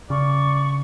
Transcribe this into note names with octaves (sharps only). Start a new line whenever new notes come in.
C#3 D5 C#6